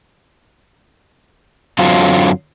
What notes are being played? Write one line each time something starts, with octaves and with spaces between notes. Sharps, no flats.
F#2 D3 F#3 C4 F4